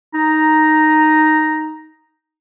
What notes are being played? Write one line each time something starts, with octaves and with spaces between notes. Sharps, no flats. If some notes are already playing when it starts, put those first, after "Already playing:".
D#4 A#5